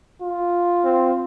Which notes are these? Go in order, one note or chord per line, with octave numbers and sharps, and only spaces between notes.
F4
C4